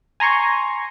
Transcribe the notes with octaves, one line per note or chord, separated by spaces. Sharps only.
G#5 A#5 C6 C#6